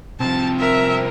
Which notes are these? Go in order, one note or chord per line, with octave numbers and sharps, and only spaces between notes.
C2 F3 C4 A5
A#4 E5